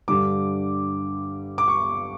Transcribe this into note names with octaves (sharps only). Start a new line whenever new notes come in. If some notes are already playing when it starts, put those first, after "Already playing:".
G2 D3 G3 D6
D6
C#6